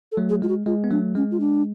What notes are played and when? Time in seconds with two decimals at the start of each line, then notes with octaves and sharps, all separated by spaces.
0.12 A4
0.17 F#3 A3
0.30 G#4
0.42 G#3 F4
0.49 F#4
0.66 G#3 F4
0.84 B3
0.91 F#3 A3 D4
1.15 G#3 C#4
1.31 F4
1.40 D4